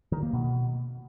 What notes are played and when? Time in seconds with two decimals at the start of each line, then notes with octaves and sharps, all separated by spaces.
0.12 D#3
0.23 A#3
0.33 B2